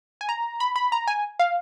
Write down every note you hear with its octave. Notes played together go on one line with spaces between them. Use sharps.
G#5
A#5
B5
B5
A#5
G#5
F5